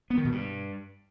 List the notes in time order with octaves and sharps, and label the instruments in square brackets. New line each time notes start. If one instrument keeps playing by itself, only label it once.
[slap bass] B3
D#3
B2
G2